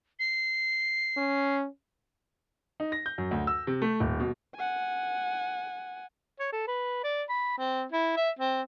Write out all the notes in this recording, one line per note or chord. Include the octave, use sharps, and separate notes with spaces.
C7
C#4
D#4
A#6
G6
F#2
D2
E6
C3
A3
D#1
B2
F#5 G#5
C#5
A4
B4
D5
B5
C4
E4
E5
C4